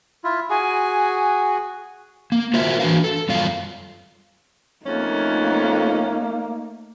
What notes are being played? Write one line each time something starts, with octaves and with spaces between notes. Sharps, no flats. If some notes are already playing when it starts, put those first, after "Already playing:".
E4 F4
F#4 G#4 G#5
A#3
F4 F#4 A#4 C5 E5
E3 D4 F#4 B4 F5
A4
F#2 G3 F4 F5
F2 A3 A#3 C#4 D#4